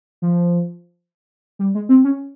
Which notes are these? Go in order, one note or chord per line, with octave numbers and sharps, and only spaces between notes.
F3
G3
G#3
C4
C#4